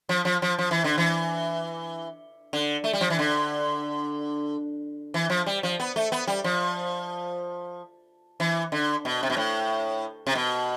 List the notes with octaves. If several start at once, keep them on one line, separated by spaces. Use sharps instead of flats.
F3
F3
F3
F3
E3
D3
E3
D3
A3
G3
F3
E3
D3
E3
F3
G3
F3
B3
A3
B3
G3
F3
E3
D3
B2
C3
B2
A2
C3
B2